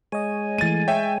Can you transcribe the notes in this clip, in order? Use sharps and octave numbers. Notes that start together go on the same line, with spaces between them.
G#3 C#5 D#5 G#5
E3 A3 A6 D#7
C#5 E5 G5